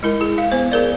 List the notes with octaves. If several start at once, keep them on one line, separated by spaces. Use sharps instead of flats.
G#3 E4 A#4
G#4
F5
B3 C5
G#4 A#4 D5